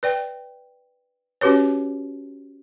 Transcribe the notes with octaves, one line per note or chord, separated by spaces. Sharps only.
B4 D5 G5
C#4 F#4 G4 B4 C#5